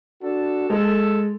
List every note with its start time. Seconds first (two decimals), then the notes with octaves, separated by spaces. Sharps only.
0.22 D4 F#4 A4
0.70 G#3 A4